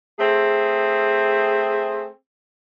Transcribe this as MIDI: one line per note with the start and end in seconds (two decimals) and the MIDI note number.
0.19 2.08 57
0.19 2.08 60
0.19 2.08 68